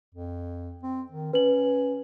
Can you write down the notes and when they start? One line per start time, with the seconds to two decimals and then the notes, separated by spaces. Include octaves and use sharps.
0.15 F2
0.83 C4
1.12 D#3
1.33 C#4 B4 F#7